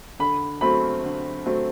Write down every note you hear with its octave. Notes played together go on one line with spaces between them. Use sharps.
D3 B5
F#3 A3 C4 B5
D3
F#3 A3 C4